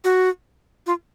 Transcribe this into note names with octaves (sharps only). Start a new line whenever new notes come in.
F#4
F4